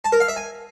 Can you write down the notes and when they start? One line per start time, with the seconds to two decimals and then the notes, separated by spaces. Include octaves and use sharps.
0.05 A5
0.12 A#4
0.20 F5
0.28 E5
0.36 G#5